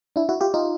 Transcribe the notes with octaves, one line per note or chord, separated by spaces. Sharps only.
D4 E4
E4 F#4
F4 G4
D#4 F4